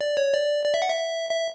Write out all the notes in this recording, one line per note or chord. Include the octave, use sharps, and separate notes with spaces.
D5
C#5
D5
D5
E5
F#5
E5
E5